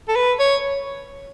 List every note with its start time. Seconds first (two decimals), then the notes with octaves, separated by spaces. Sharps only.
0.08 A4
0.16 B4
0.40 C#5